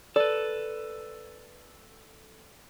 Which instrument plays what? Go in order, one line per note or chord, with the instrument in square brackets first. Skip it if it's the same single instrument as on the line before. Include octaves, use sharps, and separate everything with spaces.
[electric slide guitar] A4 B4 [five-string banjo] D5